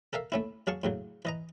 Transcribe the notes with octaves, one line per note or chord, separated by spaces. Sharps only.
A4 A#4 E5 F5
A3 C#4 E4
F#3 G#4 F5 A5 C#6
A2 C#3 F#3
E3 D#5 A#5